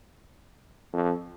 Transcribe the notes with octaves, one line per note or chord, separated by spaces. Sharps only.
F2